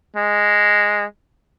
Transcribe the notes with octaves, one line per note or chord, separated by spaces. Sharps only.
G#3